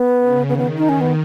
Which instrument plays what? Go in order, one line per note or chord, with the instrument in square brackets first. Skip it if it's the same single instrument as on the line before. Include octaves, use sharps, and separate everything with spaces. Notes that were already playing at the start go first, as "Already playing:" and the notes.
Already playing: [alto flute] B3
[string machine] C#3
[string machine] D#3 [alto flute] B3
[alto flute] B3
D#4
C#4
B3